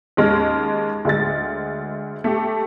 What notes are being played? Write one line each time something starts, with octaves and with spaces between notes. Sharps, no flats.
D#2 G#3 C#4 F6
D2 G#3 A6
A3 G4